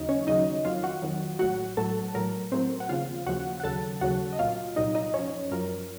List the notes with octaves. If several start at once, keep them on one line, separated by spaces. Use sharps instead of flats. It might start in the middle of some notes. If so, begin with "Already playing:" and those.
Already playing: D#2 C#3 F#3 D#4 D#5
C#4 C#5
D#2 C#3 F#3 D#4 D#5
F2 D#3 F#3 F4 F5
F#4 F#5
F2 D#3 F#3
A1 A2 F#3 F#4 F#5
A1 A2 F#3 A4 A5
A1 A2 F#3 A#4
A1 A2 F#3 C4 C5
F#5
D#2 C#3 F3 F4 F5
D#2 C#3 F3 F#4 F#5
F#5
D#2 C#3 F#3 A4 A5
D#2 C#3 F#3 F#4 F#5
D#5
C2 A#2 F#3 F4 F5
C2 A#2 F#3 D#4 D#5
D#4 D#5
F#2 F3 C#4 C#5
F#2 F3 A#4